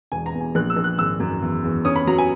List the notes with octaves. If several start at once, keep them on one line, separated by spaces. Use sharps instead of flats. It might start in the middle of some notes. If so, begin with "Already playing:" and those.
E1 G#5
A#5
E2
G#5
A#1 F#6
E6
A#1
F#6
G#1 E6
F#2
E2
E2
C#4 D#6
B5
F#3 A#5
G#5